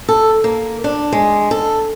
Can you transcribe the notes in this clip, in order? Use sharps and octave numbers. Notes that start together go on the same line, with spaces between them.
A4
A#3
D4
G#3
A4